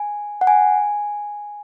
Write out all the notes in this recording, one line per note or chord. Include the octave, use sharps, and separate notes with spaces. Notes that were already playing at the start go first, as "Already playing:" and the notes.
Already playing: G#5
F#5
G#5